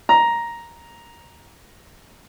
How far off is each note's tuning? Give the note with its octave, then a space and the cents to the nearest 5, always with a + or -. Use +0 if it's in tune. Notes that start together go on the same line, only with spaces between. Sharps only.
A#5 +5